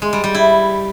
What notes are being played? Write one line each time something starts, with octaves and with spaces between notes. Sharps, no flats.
G#3
G3
G3
E4